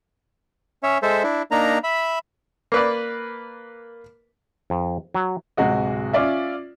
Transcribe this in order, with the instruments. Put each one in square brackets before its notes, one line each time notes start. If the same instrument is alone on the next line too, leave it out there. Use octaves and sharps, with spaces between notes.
[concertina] C#4 C#5 E5
G#3 A4 C5 E5
D4 E4
A#3 D4 D#4 A#5
E5 B5
[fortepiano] A#3 B4 D5
[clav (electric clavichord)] F2
F#3
[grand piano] D1 C3 G#3 F#4 D#5
C#4 F4 D5 E5